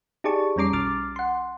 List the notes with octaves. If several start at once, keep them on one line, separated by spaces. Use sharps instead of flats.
D#4 G4 G#4 D5 A5 C#6
F2 G3 C#4 A#5 D6 C7
B1 D6 F6 A6
F#5 C6